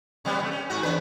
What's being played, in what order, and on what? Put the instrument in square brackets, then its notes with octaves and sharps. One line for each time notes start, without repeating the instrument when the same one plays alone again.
[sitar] C3 G3 B3
B2 A3
C#4
G#2 F#4
E2 D4 B4